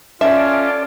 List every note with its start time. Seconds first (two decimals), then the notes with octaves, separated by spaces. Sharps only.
0.21 C#4 F4 A4 D5 E5